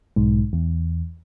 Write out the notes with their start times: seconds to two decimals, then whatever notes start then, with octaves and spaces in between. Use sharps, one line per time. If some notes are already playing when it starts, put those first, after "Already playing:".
0.16 B1 G#2
0.53 E2